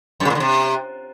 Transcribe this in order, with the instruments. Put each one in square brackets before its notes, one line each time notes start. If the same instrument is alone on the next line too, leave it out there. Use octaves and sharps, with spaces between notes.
[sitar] F#2
C#3
A#2
D3
C3